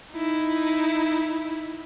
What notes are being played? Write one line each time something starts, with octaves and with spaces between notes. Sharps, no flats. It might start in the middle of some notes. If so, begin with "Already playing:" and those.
D#4 E4